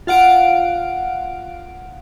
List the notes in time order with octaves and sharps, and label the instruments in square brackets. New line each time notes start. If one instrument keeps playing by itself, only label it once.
[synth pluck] F4 F5 F#5 D7